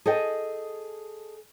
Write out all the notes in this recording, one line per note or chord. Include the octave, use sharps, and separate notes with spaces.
G#4 A4 D#5 G5